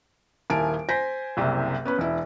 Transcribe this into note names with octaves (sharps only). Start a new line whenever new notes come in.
D#1 E4 A#4 G#5 A5 D7
C5 G#5 G6 A#6 B6
F#1 C2 C3
B3 C#4 B4
E1 E4